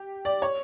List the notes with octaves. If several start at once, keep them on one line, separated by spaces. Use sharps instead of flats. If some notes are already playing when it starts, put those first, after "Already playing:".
Already playing: G4
D5
C#5